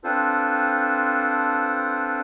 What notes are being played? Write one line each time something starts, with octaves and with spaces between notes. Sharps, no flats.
C4 D4 F4 A4 B4 C5